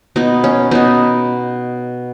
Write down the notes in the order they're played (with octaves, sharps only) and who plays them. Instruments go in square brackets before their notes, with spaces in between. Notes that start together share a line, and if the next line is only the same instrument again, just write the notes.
[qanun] B2 B3 D#4
C#4
B2 B3 D#4